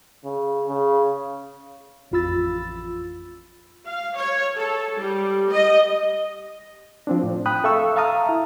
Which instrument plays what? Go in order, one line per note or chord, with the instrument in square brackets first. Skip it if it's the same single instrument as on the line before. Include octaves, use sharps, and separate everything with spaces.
[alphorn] C#3
C#3
[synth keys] A1 F2 F4 B5 E6 A6
[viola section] F5
C#5
A4
G3
D#5
[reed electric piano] F3 C4 D4
A2
G5 B5 D#6 F#6
A4 E5 F5 C#6 E6
E5 F5 A5 A#5 D#6 F6
E4